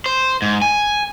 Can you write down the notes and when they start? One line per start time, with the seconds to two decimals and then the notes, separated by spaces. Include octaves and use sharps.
0.06 C5
0.42 G#2
0.62 G#5